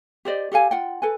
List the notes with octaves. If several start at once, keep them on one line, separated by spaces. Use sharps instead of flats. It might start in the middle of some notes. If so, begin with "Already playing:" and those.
G4 C5 D5 D#5
G4 A4 F5 G#5
F4 F#5 G5
A4 B4 G#5